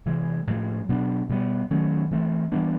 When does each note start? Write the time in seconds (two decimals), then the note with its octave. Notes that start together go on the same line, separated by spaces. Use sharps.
0.06 C3 E3 G#3
0.47 A2 F3 G#3
0.89 B2 F#3 B3 D4
1.29 B2 G3 B3
1.71 D#3 F#3 A3 C#4
2.11 E3 A3 C4
2.52 E3 G3 B3 D4